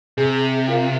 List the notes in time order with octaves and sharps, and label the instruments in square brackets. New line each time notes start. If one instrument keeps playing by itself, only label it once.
[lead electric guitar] C3 [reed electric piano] G#4
[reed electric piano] F4 A#4 F5